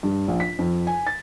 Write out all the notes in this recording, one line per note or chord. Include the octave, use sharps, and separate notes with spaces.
G2
A#1
B6
F2
G#5
A6